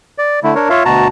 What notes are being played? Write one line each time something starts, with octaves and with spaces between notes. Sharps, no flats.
D5
D3 A3 E4
D4 A#4 C#5
F4 C#5 E5 F5
D2 B2 F#4 A5 A#5